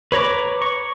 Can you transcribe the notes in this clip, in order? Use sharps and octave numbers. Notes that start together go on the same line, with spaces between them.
B4 C#5 A#5 D6
C#6